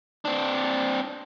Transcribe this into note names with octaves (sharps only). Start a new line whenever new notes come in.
C4 D4